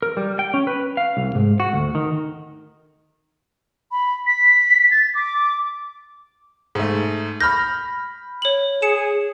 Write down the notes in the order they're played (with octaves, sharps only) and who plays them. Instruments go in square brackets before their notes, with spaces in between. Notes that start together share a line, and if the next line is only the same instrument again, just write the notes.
[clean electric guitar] A#4
G3
G5
C#4
B4
F5
C2
G#2
F#4
D2
D#3
[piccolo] B5
B6
A6
D6
[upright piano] G#2 A3
[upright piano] B5 F6 G6 [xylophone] A#6
[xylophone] C#5 F#7
[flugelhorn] G#4 [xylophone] C#7 E7